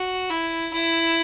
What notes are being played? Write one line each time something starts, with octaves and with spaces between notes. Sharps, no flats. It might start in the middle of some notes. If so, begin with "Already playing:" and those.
Already playing: F#4
E4
E4